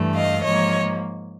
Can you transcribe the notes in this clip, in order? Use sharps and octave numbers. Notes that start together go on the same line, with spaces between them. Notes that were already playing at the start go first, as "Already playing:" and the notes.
Already playing: G2 E3 A3
D#5 F5
G#2 F3 A#3 C#5 D#5